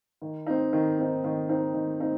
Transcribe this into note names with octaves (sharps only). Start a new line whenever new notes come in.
D#3
C4 D#4
D#3
C4 D#4
D#3
C4 D#4
D#3
C4 D#4